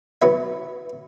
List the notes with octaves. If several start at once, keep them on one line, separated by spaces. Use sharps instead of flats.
F#3 B3 E5